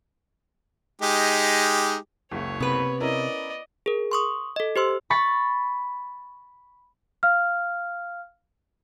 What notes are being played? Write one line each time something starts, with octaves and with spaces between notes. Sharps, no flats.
G#3 D#4 G4
F#1 C#2 C#5
C3 B3 B4
C#4 E4 A#4 D5 D#5
G#4 A#4
C6 C#6 D#6
A4 D#5
G4 C5 C6 E6
B5 C#6 A6
F5 F6